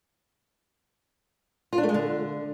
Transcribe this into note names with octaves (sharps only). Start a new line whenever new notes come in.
F4
D4
A3
G#3
D3